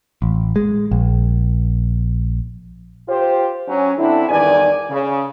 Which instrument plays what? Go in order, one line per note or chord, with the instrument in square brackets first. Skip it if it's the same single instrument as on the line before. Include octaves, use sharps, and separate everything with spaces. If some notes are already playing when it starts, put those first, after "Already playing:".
[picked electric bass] A1
G#3
A#1
[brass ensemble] F4 G4 C5
F#3 C#4
D3 C4 D4 E4
E2 G2 D#3 D5 G#5
C#3